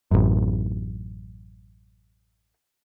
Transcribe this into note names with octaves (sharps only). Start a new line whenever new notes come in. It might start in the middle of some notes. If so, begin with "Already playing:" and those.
A1 F#2